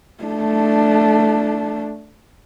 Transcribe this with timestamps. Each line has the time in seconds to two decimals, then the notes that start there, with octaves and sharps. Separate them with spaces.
0.24 A3 D4